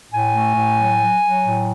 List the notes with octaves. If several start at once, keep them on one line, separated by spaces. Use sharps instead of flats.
A2 G#5
A3
A2
F#3
F#3
F#3
A2